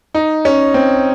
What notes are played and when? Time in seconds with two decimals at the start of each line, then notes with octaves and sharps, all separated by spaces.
0.15 D#4
0.45 C#4
0.74 C4